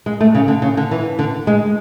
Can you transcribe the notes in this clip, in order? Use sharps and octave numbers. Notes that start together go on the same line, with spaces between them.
G#3
A3
C#3
D3
C#3
D3
E3
D3
G#3